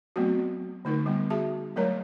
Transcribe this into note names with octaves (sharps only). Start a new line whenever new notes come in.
F#3 A3 B3 C4 F#4
D3 A3 D#4 A#4
G3 A3 B3
F#4 G#4 E5 A5
F#3 G#3 A3 A#4 C#5 A#5